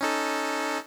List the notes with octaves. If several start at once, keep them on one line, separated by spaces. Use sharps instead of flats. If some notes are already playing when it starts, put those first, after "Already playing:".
C#4 D#4 A4